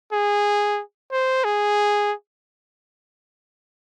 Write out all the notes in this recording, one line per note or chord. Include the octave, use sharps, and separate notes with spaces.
G#4
C5
G#4